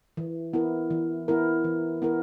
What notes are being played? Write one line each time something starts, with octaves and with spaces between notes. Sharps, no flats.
E3
B3 E4 A#4
E3
B3 E4 A#4
E3
B3 E4 A#4